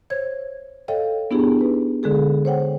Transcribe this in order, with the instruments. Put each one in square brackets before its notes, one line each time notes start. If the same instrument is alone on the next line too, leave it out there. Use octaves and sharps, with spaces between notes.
[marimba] C5 C#5 G#6
A4 C#5 D#5 F5 G5
B3 D4 E4 G4 G#4
D#4 B4
D3 G#3 G#4 A4
C5 C#5 F#5 G5